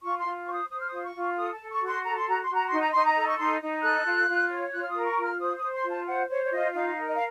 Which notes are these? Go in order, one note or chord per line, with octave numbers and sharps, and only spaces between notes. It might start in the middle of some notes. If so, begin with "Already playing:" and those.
F4 C#6
C6
F4
C5 C#6
D#6
C5 D#6
F6
F4 D#6
C#6
F4
A4 D#6
A5
A4
C#6
F#4
C6
A4 A#5
C6
F#4 A#5
C6
F#4
A#5
D#4 C6
A#5
D#4 C6
A#5
A4
C#6
D#4 C6
D#4
A4 F#6
F4
F4
C#5
F4 F#6
F6
D#6
A#4
C#6
F4
F6
C5 D#6
D#6
C5
C6
F4
A5
C5 F#5
C5 C#5
C#5
F4 D#5
D#4 F5
A#4
D#5
F5